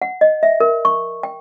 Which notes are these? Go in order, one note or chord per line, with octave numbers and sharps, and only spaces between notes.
F#5
D#5
E5
A#4
C#6
G5